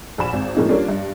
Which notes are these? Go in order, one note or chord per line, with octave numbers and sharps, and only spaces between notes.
A#1 F#4 B5 E7
G#1
A2 F3 A#3 D#4 G#4
G3 A#3 C#4 D4 F4
G2